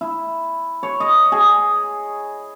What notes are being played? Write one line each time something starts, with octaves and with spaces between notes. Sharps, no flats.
E4
C#5
D#5
G#4